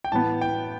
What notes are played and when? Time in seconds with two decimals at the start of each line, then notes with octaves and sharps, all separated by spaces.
0.04 G5
0.12 A2 E3 B3 A5
0.41 G5